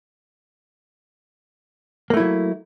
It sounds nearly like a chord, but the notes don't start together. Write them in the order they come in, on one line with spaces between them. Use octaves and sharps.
A#3 A3 E4 F#3